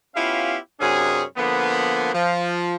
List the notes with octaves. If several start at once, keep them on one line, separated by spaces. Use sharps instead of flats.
B3 C#4 E4 F4 G4 F5
F#2 C3 C#4 D4 G#4
D3 F3 A#3 B3
F3